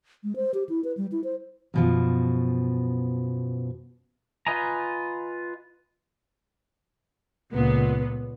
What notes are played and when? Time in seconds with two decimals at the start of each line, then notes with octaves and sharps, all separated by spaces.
0.24 G#3
0.36 C5
0.54 G4
0.69 E4
0.84 B4
0.97 G3
1.12 E4
1.24 C5
1.74 F#2 B2 F3
4.47 F4 B4 D#5 G#5 A#5
7.53 C#2 A#2 C#3 B3